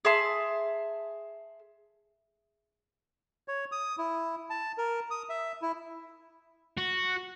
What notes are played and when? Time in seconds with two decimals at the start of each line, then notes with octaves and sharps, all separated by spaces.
0.05 G#4 E5 A5 C6
3.48 C#5
3.72 D#6
3.98 E4
4.50 A5
4.78 A#4
5.11 D#6
5.29 E5
5.62 E4
6.77 F#4